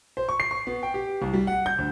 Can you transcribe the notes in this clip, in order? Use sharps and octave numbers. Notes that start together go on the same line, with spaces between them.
C5
C#6
C7
C#6
B3
G5
G4
C2
G3
F#5
G6
D2